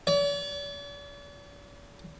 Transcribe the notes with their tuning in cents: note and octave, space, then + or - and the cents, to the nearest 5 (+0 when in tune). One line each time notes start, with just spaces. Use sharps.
D5 -45